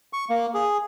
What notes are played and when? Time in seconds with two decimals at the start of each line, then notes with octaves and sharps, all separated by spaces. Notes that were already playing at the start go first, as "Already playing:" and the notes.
0.13 C#6
0.30 A#3
0.54 G#4